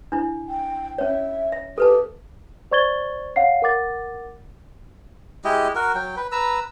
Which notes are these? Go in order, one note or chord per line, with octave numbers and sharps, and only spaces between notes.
D4 E4
G5
C#4 C#5 E5
E5
G4 A4 B4 A5
C5 D5 C#6 G#6 A6 G7
C#5 F5 F#5 C7
A#4 F#5 D6 A6
G#3 E4 G4 D#5
F#4 A#4
F#3 G5
B4
B4 A#5 E6